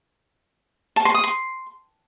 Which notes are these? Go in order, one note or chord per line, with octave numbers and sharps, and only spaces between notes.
A5
C6
D#6
C6